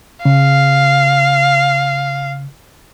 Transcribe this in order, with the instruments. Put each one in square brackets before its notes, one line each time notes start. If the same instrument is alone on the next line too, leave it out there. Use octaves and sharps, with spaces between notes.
[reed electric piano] C#3 [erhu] F5